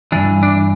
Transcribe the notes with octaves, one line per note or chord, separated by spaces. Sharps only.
G2 E3 D4
D4